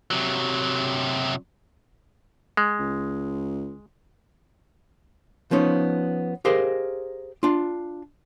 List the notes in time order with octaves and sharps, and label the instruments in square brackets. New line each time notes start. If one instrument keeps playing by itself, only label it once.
[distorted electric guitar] C3 F#3
[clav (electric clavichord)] G#3
[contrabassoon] C#2
[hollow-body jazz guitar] F3 B3 C#4 D#4 C#5
G4 G#4 A#4 C5 D#5 F5
D4 F4